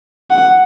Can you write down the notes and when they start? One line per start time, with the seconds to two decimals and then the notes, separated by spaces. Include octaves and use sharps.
0.30 F#5